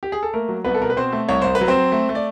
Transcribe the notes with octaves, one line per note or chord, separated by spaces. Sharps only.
G4
G#4
A4
A3 A#3 A#4
F#3
C2 B3 B4
A4
B2 A#4
B4
B2 C4 C5
A3
C2 C#5
C2 C5
B4
F#3
C4 C5
F#3
A3
A3
D5